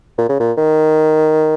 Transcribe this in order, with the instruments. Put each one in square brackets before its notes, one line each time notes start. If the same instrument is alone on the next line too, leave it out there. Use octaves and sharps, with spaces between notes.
[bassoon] A#2
C#3
A#2
D#3